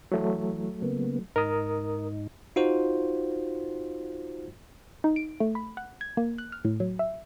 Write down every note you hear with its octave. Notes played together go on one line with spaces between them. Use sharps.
E3 F#3 A3
C#3 A#3 B3
G#2 D#4 A#4 D#6
D#4 F4 F#4 C5
D#4
D7
A3
B5
F#5
G#6
A#3
F#6
F6
A2
F#3
E5